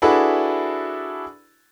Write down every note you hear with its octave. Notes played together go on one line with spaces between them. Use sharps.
D4 E4 F#4 G#4 A4 B4